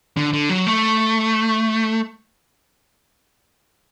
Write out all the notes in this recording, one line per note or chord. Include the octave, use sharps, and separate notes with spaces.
D3
D3
F#3
A3